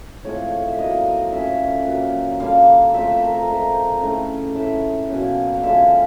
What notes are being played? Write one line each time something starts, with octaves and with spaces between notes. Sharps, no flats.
A2 F3 G#3 C4 C#5
C#5
E5
A2 F#3 A#3 D4 D#5
F3 A3 C#4 E5
A#2 F#3 A#3
D3 G3 A#3 F5
F5
F3 A3 C4 E5
E5
A#4
A#4
D3 F3 G#3 A#4
C5
C#3 E3 A3
A2 E3 A3 E5
B2 F#3 A#3 C#4
F5
D3 F3 G#3 C#4 E5